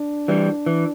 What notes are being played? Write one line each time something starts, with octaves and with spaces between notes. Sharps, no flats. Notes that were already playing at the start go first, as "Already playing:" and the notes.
Already playing: D4
E3 G3
E3